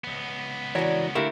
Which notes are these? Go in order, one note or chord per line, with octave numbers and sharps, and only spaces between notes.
C#2 B3
E3 F#4 A#4 C#5 D5 G#5
D3 A3 E4 F#4 G4 A#4 F5